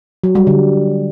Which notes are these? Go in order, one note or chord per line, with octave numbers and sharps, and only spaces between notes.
F#3
G3
D3